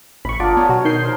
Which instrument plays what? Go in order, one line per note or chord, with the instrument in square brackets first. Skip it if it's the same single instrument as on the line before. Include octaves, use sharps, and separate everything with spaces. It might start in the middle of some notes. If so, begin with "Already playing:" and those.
[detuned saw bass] A1 [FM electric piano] B5 C#6
[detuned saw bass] G1 [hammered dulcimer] D4 G#4 A#4 [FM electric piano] F4 D5 F#5
[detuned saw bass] B3 [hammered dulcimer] C#5
[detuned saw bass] B2 [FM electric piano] F#3 F#4
[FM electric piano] D#3 G6 C7
[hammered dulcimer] F3 A#4 C5